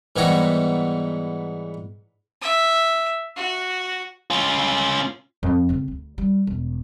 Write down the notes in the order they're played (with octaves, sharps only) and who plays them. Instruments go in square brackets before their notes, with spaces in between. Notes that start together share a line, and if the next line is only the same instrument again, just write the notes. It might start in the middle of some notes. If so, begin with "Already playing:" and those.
[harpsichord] G#2 E3 G3 B3 C#5 A#5
[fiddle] E5
F#4
[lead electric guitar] C#4 F4
[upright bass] F2
C#3 C4
D2
G3
E1